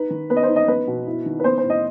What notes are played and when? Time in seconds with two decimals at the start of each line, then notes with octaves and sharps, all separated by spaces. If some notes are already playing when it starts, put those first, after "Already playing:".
Already playing: D#4 B4
0.10 D#3
0.30 B3 B4
0.36 D#5
0.43 C5
0.49 D#4
0.56 D#5
0.68 B3 B4
0.88 B2
1.07 E4
1.26 D#3
1.39 B4
1.44 B3 C5
1.58 C5
1.64 A2
1.70 D#5